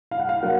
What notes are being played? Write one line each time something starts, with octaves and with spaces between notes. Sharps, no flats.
F5
F#5
F5
F#3 A#3 F#5